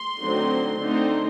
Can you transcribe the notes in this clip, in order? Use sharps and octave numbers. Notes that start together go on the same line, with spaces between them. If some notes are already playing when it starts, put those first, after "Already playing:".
Already playing: C6
D3 F#3 A3 C4 D#4
D3 A3 C4 D#4